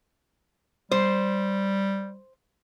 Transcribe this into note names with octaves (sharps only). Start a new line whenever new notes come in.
G3 C5